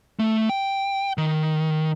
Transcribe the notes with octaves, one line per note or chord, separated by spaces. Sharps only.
A3
G5
D#3